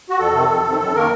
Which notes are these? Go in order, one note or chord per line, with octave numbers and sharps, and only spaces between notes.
F#4
F2 A4
C3 D#3
F2
C3 D#3
F#2 A4
D#3 A#3 A#4